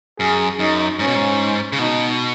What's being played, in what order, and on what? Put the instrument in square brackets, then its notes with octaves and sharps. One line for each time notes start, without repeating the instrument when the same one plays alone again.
[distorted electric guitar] F#2 [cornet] G#4
[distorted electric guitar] F#2 [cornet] D#4
[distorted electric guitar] G#2 [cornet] C#4
[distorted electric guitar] B2
G#2
C#3
[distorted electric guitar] B2 [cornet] D#4